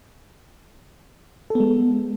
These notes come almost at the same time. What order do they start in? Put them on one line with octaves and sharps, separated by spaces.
A4 B3 G#3